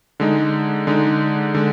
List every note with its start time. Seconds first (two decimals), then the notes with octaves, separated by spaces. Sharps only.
0.20 D3 G#3 D#4
0.87 D3 G#3 D#4
1.54 D3 G#3